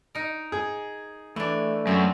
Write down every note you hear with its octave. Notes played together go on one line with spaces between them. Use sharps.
D#4 A#4
G#4
E3 A3 D4
F#2 C4